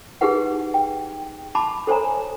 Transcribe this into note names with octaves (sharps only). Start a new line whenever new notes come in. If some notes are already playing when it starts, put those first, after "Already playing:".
D#4 G4 G#4 B4 F#5
G5
A5 B5 D6
A4 C5 C#5 G#5 A#5